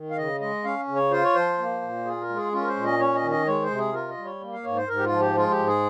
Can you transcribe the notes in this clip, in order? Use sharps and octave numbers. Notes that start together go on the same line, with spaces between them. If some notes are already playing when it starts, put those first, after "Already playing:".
Already playing: D#3
F5
C#3 D#5
G#3 D#5
C#4 F5
C#3
C#5
F4 C5
C#5
F3 C5
A#3
A#2
F4 G#4
A#4
G#3
G#4
C#4 F4
A#4
C5
A#2
D#5
C#4 C#5
D#5
D#3
D#5
G#3 C#5
C5
C3
G#4
F4 A#4
D#5
G3
C#5
A#3
F5
G#2 C#5
C5
G#2 A#4
G4
F4
F3
G4
G#3 F4
G4
G#2
G#4